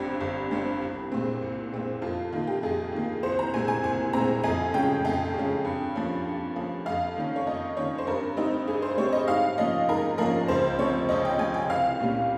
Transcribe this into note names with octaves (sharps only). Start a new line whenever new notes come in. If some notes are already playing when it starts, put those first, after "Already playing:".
Already playing: G1 G2 G3 C4 G4
G1
G2 G3 C4
C2
A#2 G#3 C4
C2
A#2 G#3 C4
F2 F4
D#3 A#3 F4
G4
F2 G#4
D#3 A#3
C2 C5
A#5
A#2 G#3 C4 G#5
G#5
C2 G#5
A#2 G#3 C4 A#5
F2 G#5
C#3 G#3 C#4 G5
F2 G5
C#3 G#3 C#4
G2
F3 A#3 C#4
G2
F3 A#3 C#4
F2 F5
D#3 A#3 C#4
C#5
F2 D#5
D#3 A#3 C#4 C#5
C5
G2 A#4
G3 C4 D#4
G2 G#4
C5
G3 C4 C#5
D#5
G#2 F5
F3 A#3 C#4 D#5
G#2 A#4
F3 A#3 C#4 A#4
C#2 C5
C3 F3 C#5
C#2 D#5
G5
C3 F3 G#5
G5
C2 F5
A#2 G3 A#3 C#4